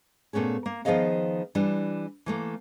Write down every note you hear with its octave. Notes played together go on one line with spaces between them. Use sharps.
A#2 A3 B3 C#4 G#4
A#3
D#3 F3 B3 G#4 D#5 F5
E3 G3 D4
E3 A3 A#3